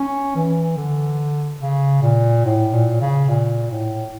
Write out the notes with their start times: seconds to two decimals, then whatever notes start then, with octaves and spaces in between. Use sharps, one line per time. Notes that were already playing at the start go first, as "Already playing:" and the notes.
Already playing: C#4
0.35 E3
0.77 D3
1.61 C#3
2.03 A#2
2.45 A2
2.73 A#2
3.01 C#3
3.29 A#2
3.71 A2